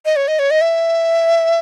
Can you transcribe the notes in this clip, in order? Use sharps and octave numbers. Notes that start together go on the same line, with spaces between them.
D#5
C#5
D#5
C#5
D#5
E5